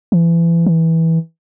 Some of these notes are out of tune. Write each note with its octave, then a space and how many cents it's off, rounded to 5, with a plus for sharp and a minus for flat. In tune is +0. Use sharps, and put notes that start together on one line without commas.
E3 +30
E3 -15